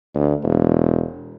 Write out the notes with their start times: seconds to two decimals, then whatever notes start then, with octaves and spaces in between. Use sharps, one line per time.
0.14 D2
0.43 E1